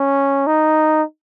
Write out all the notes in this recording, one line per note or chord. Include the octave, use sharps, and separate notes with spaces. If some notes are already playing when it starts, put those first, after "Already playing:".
Already playing: C#4
D#4